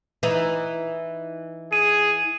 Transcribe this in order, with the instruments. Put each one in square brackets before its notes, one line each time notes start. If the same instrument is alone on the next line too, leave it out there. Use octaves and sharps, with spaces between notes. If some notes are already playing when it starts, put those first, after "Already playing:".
[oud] E3 D#4
[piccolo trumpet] G#4 [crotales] D#7